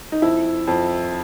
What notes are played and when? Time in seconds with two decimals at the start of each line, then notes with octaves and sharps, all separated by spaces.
0.12 D#4
0.22 F2 E4
0.67 F2